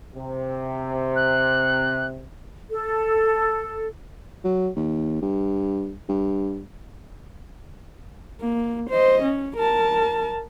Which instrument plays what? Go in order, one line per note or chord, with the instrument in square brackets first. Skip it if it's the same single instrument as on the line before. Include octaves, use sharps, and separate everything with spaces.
[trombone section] C3
[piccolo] F#6
[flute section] A4
[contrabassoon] F#3
D#2
G2
G2
[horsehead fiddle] A#3
C5 D#5
C#4
A#4 A5